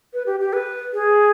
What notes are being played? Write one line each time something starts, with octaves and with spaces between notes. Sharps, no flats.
B4
G4
G4
B4
G#4